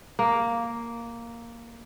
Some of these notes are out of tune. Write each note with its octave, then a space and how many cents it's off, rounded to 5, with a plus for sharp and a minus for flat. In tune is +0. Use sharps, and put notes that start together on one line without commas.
A#3 +0